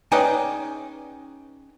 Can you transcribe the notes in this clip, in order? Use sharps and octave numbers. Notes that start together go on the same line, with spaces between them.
C#4 D#4 G#4 B4 D5 G5